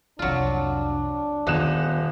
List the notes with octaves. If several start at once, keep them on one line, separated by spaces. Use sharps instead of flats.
C2 F2 F#3 D4 F4
D#1 D3 B3 D#4 F#6 E7